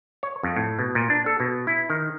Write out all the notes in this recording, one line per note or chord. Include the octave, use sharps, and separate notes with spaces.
C#5
F2
A2
B2
A#2
D4
A4
B2
E4
D#3